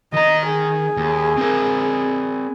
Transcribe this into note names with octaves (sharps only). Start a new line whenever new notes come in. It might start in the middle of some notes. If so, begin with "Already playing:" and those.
D#3 D#5 A#5
G#4
D#2
C4 A#4